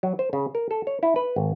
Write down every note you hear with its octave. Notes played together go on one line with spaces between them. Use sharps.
F#3
C5
C#3
A#4
A4
C#5
E4
B4
G#1